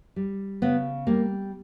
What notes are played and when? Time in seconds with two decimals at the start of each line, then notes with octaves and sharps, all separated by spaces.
0.16 G3
0.62 C#3 B3
1.07 G3 A#3